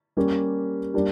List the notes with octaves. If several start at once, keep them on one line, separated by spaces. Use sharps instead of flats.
G3 A#3 C#4 G4
G3 A#3 D4 G4